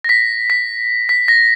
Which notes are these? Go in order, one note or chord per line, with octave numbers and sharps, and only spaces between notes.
A#6
B6
B6
B6
A#6